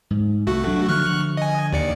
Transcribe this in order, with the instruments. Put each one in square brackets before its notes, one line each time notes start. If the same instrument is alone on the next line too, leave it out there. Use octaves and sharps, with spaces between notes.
[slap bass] G#2
[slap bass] C2 [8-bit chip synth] A3 F#4
[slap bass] F#3 D4
[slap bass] D3 F3 [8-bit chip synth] C#6 F6 F#6
[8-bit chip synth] D#5 G#5
D#2 D5 C#7